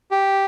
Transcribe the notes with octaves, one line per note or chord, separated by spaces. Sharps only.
G4